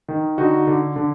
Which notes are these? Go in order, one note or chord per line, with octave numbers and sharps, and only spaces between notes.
D#3
D3 D#4 F#4
D3
D3